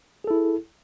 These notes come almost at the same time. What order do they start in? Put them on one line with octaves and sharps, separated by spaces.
G#4 A4 E4